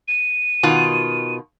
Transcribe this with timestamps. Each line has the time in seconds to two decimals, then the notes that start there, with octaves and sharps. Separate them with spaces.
0.08 D#7
0.63 B2 D#3 F4